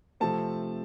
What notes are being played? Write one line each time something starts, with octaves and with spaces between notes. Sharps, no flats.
C3 F3 A3 C4 A5